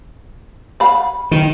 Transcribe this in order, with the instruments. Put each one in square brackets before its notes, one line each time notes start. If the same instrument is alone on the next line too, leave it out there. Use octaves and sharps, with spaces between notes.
[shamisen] F5 F#5 B5
[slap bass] D#3